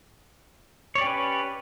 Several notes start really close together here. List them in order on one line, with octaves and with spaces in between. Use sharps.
C#5 D5 G4 C#4 B4